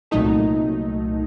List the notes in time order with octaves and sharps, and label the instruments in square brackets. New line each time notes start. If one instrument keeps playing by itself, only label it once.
[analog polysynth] C2 A#2 F#3 A3 D#4